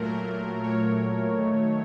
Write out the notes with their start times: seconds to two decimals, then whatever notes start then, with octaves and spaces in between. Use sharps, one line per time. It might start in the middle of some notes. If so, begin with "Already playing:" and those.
Already playing: A#2 F#3 A3 A#4
0.63 C#5
1.37 D#3 F#3 A3